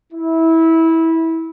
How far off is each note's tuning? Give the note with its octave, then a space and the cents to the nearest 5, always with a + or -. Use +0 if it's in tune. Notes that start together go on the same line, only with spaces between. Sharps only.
E4 -20